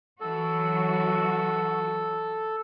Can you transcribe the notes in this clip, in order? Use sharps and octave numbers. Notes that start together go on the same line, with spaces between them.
E3 F#3 F#4 A4